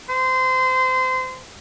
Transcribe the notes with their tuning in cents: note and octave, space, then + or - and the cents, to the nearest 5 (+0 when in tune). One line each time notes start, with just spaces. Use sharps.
C5 -25